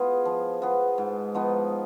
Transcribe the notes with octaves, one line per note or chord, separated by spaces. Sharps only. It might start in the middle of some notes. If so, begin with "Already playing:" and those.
Already playing: B3 F4 G#4
F3
B3 F4 G#4
G#2
F3 B3 D#4